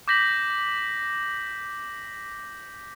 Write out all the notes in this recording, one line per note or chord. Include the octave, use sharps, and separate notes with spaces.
D6 G6 A#6 B6 F#7